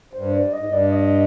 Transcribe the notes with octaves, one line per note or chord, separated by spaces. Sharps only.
G2 C5
D5
D#5
G#2
G2
D5
D#5